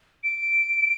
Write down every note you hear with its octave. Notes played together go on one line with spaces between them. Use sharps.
D7